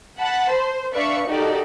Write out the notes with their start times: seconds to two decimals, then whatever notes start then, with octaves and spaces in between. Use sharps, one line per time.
0.19 F#5 A5 B5
0.51 C5
0.94 D4 B4 D5 E5 F5 C#6
1.26 D#4 F#4 G4 A4 A#4 D5